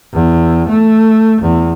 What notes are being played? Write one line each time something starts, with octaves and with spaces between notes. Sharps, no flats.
E2
A3
E2